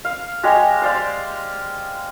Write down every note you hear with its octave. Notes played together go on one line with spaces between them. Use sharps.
F5
G#3 G4 C#5 D#5
C5 D5 F5